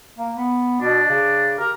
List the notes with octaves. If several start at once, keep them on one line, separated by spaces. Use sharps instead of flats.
A#3
B3
B2 D4
C#3
G4 A#4